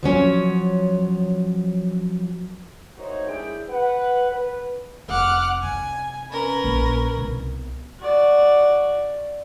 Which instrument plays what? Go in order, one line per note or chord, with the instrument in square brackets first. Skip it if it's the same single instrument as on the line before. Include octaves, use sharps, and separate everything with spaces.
[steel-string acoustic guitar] F3 F#3 C#4
[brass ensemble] A3 D#4 F#4 A#4 C5 C#5
G#3 D4 E4 G#4 G5
B4 F#5
B4
[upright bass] F1 [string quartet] F#5 D6 F6
[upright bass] C3 [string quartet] G#5
[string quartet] C#4 A#4 B4
[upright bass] A#1
C2 B2
[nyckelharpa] F#4 D5